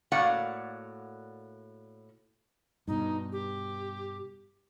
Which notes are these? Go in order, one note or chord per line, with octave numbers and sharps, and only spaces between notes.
A2 A#3 F#4 D5 F5 F#5
G2 B2 D#4
G4